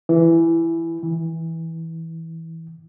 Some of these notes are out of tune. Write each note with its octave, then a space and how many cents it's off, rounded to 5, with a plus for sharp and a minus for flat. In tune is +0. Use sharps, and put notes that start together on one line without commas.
E3 +10
E3 -15